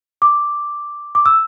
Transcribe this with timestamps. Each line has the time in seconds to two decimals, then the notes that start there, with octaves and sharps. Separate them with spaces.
0.22 D6
1.15 D6
1.26 E6